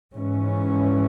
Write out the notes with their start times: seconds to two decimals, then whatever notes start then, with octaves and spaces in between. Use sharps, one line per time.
0.15 G#2 E3 C#4